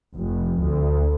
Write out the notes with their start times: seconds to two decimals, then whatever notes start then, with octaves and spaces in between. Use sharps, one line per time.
0.16 F1
0.61 D2